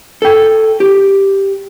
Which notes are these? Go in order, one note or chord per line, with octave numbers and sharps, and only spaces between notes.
A4 G5
G4